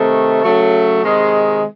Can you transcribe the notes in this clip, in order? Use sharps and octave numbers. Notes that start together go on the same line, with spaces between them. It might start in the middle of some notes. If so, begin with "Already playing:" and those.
Already playing: C3 D#3 A3
C#3 F#3 A3
C3 D#3 G#3